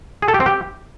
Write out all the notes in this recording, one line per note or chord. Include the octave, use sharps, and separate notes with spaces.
G#4
A4
G4
C4
G4